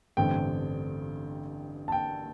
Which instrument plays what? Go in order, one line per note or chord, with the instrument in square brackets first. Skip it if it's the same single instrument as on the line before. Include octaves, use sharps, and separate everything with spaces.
[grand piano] A1 G2 D3 A3 C4 G5
A5
G5